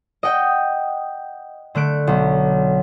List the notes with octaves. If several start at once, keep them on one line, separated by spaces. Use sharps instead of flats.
D#5 F#5 G5
D3 A3 F#6 D7
B1